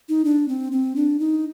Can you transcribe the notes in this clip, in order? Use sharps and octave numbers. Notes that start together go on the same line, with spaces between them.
D#4
D4
C4
C4
D4
D#4